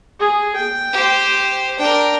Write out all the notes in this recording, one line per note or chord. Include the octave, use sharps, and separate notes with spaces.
G#4
G5
G4 C5
D4 A#4 G5